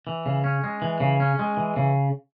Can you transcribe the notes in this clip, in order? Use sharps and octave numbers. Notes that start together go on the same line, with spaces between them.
E3
C#3
C#4
G#3
E3
C#3
C#4
G#3
E3
C#3